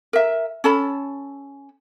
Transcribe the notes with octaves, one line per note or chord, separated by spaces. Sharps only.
A#4 E5
C#4 A4 A5 B5